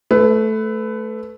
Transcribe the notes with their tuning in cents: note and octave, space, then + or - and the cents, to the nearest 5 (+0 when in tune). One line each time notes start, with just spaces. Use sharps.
A3 -10 B4 +20